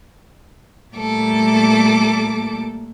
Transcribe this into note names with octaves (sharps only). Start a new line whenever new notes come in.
A#2 G3 A3 A#3 A4 D6